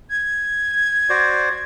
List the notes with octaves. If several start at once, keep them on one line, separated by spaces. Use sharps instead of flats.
G#6
F#4 C5 D5